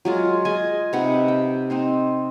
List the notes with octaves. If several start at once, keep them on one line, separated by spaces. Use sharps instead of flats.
F#3 G#3 F4
G#4 D#5 G#5
C3 D#4 B4 F#5
G5
C4 D#4 C5